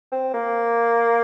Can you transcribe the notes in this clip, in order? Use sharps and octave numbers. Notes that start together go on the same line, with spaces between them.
C4
A#3